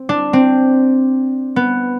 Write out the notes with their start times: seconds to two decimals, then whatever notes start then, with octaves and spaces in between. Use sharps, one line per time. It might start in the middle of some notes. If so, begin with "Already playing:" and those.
Already playing: C4
0.09 D4
0.33 C4
1.56 B3